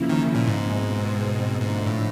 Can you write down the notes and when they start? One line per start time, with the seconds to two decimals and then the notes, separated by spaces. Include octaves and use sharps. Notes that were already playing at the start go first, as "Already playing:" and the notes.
Already playing: C#3 F3 A#3 C#4 E4
0.09 D#3
0.35 A#2
0.47 G#2
0.60 B2 G#3 C4
1.61 G#2 D3 F3 A3
1.86 A2